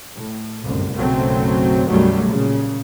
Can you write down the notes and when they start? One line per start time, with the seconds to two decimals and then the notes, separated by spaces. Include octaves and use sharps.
0.17 A2
0.64 G1 C2 F#2 A2
0.97 B1 F#2 C#3 F#3 A3 C4
1.87 B1 F#2 D#3 F#3 G3 A3
2.25 A#2 C#3